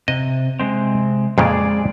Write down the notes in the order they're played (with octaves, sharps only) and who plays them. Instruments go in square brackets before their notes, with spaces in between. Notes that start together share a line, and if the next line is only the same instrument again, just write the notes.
[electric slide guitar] C3 [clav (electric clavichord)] D#5
[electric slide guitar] C3 G#3 C4
[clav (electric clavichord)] F2 A#2 C#3 [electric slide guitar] G#3 G#4 D5